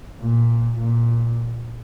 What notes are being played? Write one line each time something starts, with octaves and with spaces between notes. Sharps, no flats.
A#2
A#2